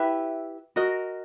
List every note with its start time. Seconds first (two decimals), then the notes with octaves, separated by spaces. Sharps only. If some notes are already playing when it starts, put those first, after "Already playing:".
Already playing: E4 G4 B4 E5
0.76 F#4 A#4 D#5